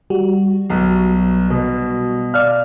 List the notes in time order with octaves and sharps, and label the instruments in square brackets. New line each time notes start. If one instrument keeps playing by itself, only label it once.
[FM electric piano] G3 F#4
[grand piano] B1
B2
[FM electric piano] D5 F5 [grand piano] F6